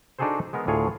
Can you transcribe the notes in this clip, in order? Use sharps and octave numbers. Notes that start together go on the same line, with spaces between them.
D4 D#4 F#4 G#4 A4 C5
G#3 B3 A#4
D2 A2 F4 G#4 C#5